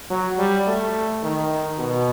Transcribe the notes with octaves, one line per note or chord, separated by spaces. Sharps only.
F#3
G3
A3
D#3
B2